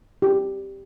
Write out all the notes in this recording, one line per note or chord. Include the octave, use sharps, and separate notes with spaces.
G4